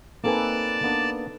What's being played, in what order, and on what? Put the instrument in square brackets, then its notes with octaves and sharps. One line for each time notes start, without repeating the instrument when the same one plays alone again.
[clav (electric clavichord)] A#3 C4 G#5 [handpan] D#4 A4 B4 [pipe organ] D5 A5
[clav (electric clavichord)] A#3 B3 D4